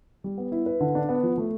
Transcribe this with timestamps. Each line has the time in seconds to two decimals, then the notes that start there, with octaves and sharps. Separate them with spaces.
0.24 G3
0.38 B3
0.52 E4
0.66 B4
0.80 D3
0.95 D4
1.09 B3
1.23 F3
1.38 A3